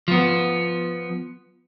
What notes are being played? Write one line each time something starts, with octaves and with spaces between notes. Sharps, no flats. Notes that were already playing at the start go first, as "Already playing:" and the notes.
F3 B3